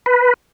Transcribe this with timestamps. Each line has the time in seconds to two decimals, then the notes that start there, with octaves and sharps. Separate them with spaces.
0.06 B4